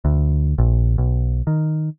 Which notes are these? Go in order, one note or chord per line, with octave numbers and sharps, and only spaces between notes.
D2
A#1
B1
D#3